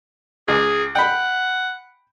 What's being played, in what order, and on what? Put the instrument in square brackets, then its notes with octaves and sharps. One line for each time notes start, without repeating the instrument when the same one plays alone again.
[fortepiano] C#2 [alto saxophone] G#4
[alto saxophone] F#5 [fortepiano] G5 B5